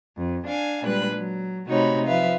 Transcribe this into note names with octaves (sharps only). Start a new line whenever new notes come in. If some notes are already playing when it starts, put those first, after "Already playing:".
F2
D4 F5 G#5
A#2 G3 G#3 D4 B4 F#6
F#3
C3 A3 D#4 F#4 C#5 B5
F3 B4 E5 F5